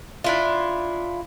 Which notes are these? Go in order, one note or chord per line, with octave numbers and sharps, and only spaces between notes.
D4 E4 F4